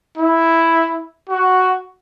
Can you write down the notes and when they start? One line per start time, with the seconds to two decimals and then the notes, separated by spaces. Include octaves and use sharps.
0.17 E4
1.29 F#4